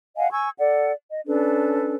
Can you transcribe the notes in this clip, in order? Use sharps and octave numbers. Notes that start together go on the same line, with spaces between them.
D#5 F5 F#5 G#5
G#5 C#6 E6 G#6
A4 D5 F#5
D#5
C#4 D4 A4 B4